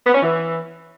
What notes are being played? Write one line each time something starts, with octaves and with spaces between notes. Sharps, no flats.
B3
C#4
E3